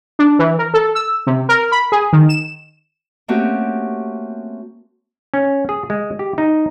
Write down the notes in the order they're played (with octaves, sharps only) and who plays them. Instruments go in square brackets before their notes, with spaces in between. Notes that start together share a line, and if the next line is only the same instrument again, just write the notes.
[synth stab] D4
E3
A#4
A4
E6
C3
A#4
B5
G#4
D#3
E7
[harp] A3 A#3 C4 C#4 F#4 G4
[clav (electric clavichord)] C#4
G#4
G#3
G4
D#4